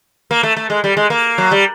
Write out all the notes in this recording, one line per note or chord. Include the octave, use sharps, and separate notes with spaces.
A#3
A3
A3
G#3
G3
G#3
A#3
F#3
G3